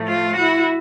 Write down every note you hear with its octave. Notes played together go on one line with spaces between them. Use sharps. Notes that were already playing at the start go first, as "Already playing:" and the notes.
Already playing: A2 F3 A3
F4
E4 F#4